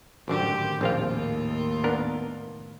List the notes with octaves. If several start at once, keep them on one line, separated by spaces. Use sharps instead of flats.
G#1 F#2 A2 D3 D#3 G4 C5 D6
A#1 D#2 C4 F4 F5
B3 D4 A#4